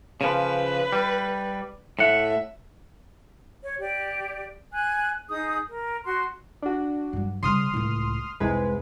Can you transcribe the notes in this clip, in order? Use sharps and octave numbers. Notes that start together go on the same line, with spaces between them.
C#3 F3 B4
G3
A2 E5 F#5
C#5
G4 D5
G#5 F#6
D#4 G#4 D#6 G6
A#4
F#4 C6
D4 F#4
G2 F#3
C#3 G3 C6 D#6 F6
C#2 A2
F1 C2 G#3 B4